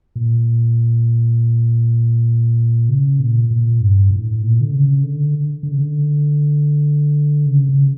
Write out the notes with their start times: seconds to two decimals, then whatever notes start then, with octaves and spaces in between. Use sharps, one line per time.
0.16 A#2
2.89 C#3
3.20 A#2
3.51 A#2
3.81 G2
4.11 A2
4.42 A#2
4.61 D3
4.71 C#3
5.03 D3
5.63 D3
5.72 C#3
5.81 D3
7.46 C#3
7.69 C#3